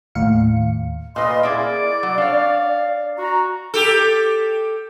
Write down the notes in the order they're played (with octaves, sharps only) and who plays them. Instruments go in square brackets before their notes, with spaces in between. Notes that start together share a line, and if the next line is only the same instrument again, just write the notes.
[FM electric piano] D#2 A2 F5 C#7
[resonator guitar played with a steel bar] A#2 B4 [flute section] D#5 C6 [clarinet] F5
[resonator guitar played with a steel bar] A#3 E4 G#4 [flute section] D5 [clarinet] D6
[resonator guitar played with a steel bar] F#3
[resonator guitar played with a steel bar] D4 C#5 [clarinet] F5
[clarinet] F#4 [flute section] A#5
[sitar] G4 A4